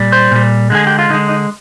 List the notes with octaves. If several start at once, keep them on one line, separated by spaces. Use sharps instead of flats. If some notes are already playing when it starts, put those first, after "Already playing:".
Already playing: A#2 G3
C5
A#2 G3
D3 G#3 G#4
G4
F4
D3 G#3 D#4
D#4